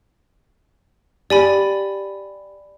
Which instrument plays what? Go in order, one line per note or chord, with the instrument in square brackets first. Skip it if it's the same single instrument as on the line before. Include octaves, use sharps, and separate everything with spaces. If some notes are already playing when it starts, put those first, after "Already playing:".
[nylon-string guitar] G4 [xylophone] D5 G#5 B5